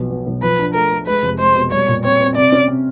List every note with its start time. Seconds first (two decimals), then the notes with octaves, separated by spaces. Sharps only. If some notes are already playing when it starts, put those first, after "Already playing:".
Already playing: B1 B2 F3
0.10 B2
0.27 B1
0.42 F3 B4
0.59 D4
0.74 A3 A#4
0.91 A3
1.07 G#3 B4
1.23 F1
1.39 G#3 C5
1.55 B2
1.72 G3 C#5
1.88 A#2
2.04 C4 C#5
2.20 C4
2.36 C3 D5
2.52 C#4
2.68 C3